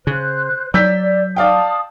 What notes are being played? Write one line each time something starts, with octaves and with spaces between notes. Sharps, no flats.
C#3 C5 F#6
F#3 D5 E6 G6 B6
D5 F5 G5 A5 D#6